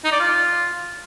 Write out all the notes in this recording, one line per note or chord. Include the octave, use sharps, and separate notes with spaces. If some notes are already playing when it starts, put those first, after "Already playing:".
D#4
D5
F4